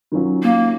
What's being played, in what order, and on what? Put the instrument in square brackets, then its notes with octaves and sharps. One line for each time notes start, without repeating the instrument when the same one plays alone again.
[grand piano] D#3 F#3 C#4 F4
[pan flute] A#3